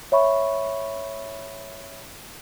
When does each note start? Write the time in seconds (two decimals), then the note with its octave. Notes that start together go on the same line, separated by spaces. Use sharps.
0.12 C#5 E5 B5 C#6